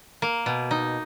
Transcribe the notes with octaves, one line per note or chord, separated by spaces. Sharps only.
A#3
B2
D#4